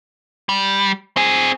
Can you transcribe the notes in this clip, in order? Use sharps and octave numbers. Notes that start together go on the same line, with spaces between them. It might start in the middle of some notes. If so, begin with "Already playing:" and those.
G3
C4 G#4